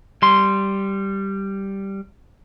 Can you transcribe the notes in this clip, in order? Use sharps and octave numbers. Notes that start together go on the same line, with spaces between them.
G3 C6